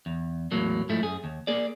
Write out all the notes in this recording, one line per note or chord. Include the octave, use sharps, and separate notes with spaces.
E2
E2 A2 F#3 A#3
G#2 F3 A3 E4
F#2 G#4
D#2
A#3 G#4 D5